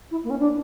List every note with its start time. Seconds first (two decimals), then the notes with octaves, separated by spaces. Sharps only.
0.10 E4
0.23 A#3
0.30 C#4
0.39 D4